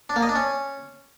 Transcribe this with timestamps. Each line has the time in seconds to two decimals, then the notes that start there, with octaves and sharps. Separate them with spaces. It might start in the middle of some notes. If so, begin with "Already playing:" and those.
0.10 D4
0.16 A#3
0.23 D#5
0.29 D4
0.35 C#4